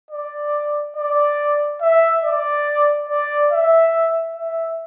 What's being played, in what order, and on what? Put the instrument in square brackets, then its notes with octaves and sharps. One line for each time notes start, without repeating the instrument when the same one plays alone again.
[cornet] D5
D5
E5
D5
D5
E5
E5